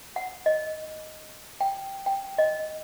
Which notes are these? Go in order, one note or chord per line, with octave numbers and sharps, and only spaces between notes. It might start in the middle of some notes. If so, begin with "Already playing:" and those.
F#5
D#5
G5
G5
D#5